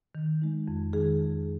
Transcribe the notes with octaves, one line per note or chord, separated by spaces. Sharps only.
D#3
G#3 D#4
F2
D#3 G#3 D#4 G#4
F2